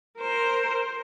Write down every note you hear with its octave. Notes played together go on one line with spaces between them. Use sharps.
A#4 C5